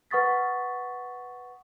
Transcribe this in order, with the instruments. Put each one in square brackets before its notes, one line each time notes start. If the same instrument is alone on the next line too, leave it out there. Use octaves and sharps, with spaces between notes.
[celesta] B4 F#5 C#6 D#6 A6 B6